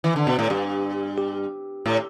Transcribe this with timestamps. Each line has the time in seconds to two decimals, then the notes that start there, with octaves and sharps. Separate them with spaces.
0.04 E3
0.16 D3
0.27 B2
0.39 A2
0.50 G2 G4
1.18 G4
1.86 A2